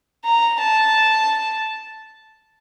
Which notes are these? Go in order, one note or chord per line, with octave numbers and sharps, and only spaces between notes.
A#5
A5